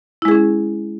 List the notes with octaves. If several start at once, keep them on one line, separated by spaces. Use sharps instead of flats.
G#3 C#4 E4 G#4